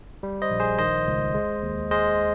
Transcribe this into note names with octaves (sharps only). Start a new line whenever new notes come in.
G3
C5 D#5
A#1
G#4 C5
D#3 C5 D#5
C#2
G#3
D#2
G#3 C5 D#5